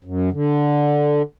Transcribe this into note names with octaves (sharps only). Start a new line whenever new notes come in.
F#2
D3